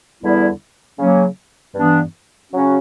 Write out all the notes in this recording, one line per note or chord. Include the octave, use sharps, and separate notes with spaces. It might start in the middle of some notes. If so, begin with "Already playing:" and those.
E2 D3 G3 B3 E4
C#3 F#3 A#3 C#4
G2 E3 B3 D4
C#3 F#3 C#4 F#4